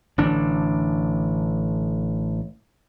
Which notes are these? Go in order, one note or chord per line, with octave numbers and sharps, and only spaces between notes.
A1 D3 D4